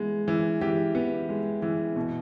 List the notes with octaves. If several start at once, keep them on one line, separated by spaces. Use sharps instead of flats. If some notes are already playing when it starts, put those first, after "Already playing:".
Already playing: E3 G#3 B3
E3
E3 G4
B3
G#3
E3
B2